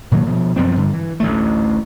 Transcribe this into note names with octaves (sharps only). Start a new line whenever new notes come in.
A#2 D#3 F#3 A#3
B2 F3
F#2 F3 B3 C4
G2 D3
E3
A1 D2 A3